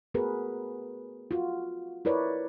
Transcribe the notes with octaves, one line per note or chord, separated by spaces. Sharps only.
A3 B3 F#4 G#4 A#4 B4
F4 F#4
E4 A#4 B4 C#5 D5